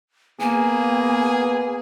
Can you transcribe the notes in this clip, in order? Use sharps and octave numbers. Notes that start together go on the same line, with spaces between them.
A#3 B3 G#4 G#5